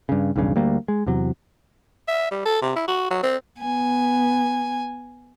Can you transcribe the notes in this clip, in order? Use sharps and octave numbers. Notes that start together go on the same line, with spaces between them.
G2 C#3
B1 E2 G2 C#3
D2 G3 A#3
G#3
E2 C3 F#3
E5
G3
A4
C3
E4
F#4
F#3
C4
B3 G#5